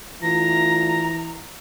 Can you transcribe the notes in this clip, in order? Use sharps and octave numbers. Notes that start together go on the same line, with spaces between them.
E3 A3 D4 F4 A#5 A#6